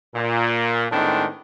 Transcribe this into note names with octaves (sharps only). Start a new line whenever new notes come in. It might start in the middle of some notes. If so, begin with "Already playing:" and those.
A#2
A2 D#3 G#3 B3 C4 D4